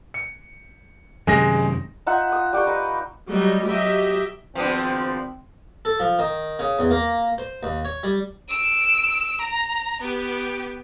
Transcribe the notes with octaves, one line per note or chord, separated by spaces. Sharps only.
C#7
F#2 C3 D#3 G#3 A#6
D#4 F4 E5 F#5
D#6
G3 G5 C#6
D#4 B4
F#3 G3 D#5
F#3 G4 D#5 E5
G#1 F3 B3 C4 D4
A4
F3
D#3
C#3
E2
A#3
C5
D#2
C#5
G3
E6 D7
A#5
B3 G4